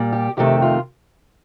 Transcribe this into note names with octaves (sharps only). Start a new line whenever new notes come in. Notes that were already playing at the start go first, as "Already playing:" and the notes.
Already playing: A#2 G3
G4
F2 C3 D#3 A3 G4
F4